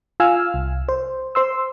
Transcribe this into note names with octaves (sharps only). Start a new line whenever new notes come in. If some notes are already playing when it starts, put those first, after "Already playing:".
F4 F5 G#5 E6 F6
C2
C5
C5 C6 E6